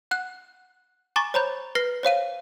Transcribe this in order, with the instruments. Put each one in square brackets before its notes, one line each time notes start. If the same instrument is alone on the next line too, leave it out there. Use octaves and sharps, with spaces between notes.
[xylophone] F#5 F#6
G#5 A#5 C#6 D6 A6
C5 C#5 A#5 B5 G6
B4 F6 A#6 C7
C5 C#5 F5 D#7